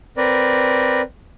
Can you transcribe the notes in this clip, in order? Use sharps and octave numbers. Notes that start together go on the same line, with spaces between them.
C4 A#4 B4 D5